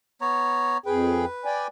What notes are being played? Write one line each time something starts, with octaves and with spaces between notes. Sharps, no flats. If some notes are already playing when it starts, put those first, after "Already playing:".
B3 C#5 A#5
F2 G#4 B4 G5
D5 G5 G#5